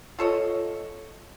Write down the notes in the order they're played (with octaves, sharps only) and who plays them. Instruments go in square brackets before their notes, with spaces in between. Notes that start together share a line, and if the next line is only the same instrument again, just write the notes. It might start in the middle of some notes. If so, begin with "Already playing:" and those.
[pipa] F4 A4 C#5 D#5